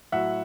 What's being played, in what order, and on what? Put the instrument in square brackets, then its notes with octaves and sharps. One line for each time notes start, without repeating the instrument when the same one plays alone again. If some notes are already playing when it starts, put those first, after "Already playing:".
[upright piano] A2 F#3 E5 F#5